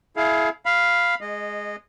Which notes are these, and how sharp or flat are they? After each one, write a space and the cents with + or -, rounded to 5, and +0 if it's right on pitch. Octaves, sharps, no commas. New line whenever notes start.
E4 +0 G#4 +35 F5 +0
F5 +0 B5 +0
G#3 +0 D#5 -20